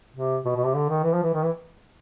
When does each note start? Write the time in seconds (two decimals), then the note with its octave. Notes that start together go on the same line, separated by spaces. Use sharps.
0.16 C3
0.45 B2
0.56 B2
0.65 C3
0.75 D3
0.89 D#3
1.03 E3
1.13 F3
1.23 E3
1.34 D#3
1.43 E3